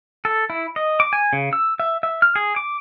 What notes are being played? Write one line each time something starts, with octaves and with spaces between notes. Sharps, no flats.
A4
E4
D#5
D6
G#5
C#3
E6
E5
E5
F6
G#4
D6